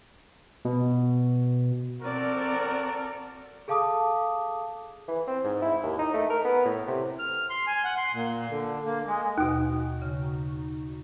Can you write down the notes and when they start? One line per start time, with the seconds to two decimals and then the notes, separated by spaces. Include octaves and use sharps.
0.65 B2
2.01 C4 F#4 A4 A#4 D5
3.68 G#4 A4 F5 A5 D6 D#6
5.08 E3
5.27 C4
5.44 G#2
5.62 E4
5.83 D#2
5.99 D#4
6.14 A3
6.30 A#4
6.44 B3
6.65 A2
6.87 C3
7.19 F6
7.50 C6
7.67 G#5
7.85 F#5
7.97 C6
8.13 A#2
8.50 D3
8.85 A#3
9.07 G#3
9.38 D#2 B2 D#4 F#4
10.02 C#3